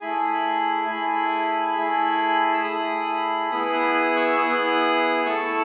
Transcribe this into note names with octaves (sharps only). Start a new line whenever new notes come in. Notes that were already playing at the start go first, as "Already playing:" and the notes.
A3 E4 G#4 G#5 B5
A3 E4 G#4
A3 E4 G#4
E6
A3 E4 G#4 B5 D#6
B3 E4 G#4 B5 D#6
D#6 F#6
D#6 F#6
C#6 E6
B3 E4 G#4 D#6 F#6
A3 E4 A4 C#6 E6